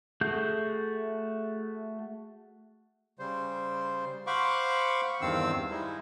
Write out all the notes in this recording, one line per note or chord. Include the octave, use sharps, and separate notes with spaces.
A3 F#4 G#4 G6
C#3 G3 C5
C5 F5 F#5 B5 C#6 D6
E2 G2 D#3 C4 F5 E6
G3 G#3 D#4 E4